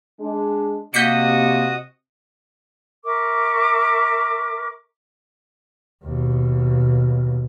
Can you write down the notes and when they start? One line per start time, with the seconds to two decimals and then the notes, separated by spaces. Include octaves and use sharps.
0.20 G#3 D4
0.94 C3 A#3 F#4 D#5 D#6 G6 B6 C#7
3.05 A#4 E5 C#6 D6
6.04 D#2 B2